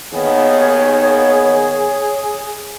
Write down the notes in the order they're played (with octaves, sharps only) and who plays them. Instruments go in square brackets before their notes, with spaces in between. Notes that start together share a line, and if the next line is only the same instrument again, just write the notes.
[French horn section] D#2 D#3 B3 [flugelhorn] G#4 [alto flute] C#5